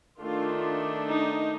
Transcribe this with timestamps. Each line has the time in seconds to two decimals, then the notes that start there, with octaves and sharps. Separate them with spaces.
0.20 D#3 A3 D4 F4
1.07 D#4